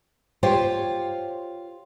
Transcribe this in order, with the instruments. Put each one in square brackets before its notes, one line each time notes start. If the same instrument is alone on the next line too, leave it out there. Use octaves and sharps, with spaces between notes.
[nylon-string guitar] F4 G4 C5 C#5 G5